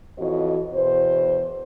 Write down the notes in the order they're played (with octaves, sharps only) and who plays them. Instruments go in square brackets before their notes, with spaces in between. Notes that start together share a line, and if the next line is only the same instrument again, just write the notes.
[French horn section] F2 E3 F#4 C#5 D#5
E2 B2 C5